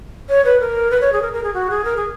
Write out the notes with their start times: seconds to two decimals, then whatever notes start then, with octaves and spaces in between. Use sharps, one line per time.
0.29 C#5
0.44 B4
0.60 A#4
0.90 B4
1.01 C#5
1.12 G#4
1.22 A#4
1.33 A#4
1.43 G#4
1.53 F#4
1.70 G#4
1.84 A#4
1.96 G#4